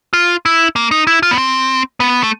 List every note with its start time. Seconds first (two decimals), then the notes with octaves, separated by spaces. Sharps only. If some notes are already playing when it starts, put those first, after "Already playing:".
0.13 F4
0.46 E4
0.76 A#3
0.91 D#4
1.07 E4
1.23 F4
1.31 B3
1.38 C4
2.00 B3
2.23 A3